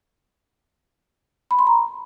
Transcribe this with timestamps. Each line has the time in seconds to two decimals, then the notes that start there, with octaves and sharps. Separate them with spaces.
1.51 B5
1.59 C6
1.67 A#5